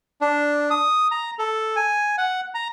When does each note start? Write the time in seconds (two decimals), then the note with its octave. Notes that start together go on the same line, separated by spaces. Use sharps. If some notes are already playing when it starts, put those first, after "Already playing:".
0.21 D4
0.71 D#6
1.11 A#5
1.39 A4
1.76 G#5
2.18 F#5
2.54 A#5